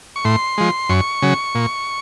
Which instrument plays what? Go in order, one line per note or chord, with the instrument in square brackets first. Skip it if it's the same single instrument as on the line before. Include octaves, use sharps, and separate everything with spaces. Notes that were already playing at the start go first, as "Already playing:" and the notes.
[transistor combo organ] C#6
A2 C6
F3 G#3
F#2 C#6
C#3 F#3
A#2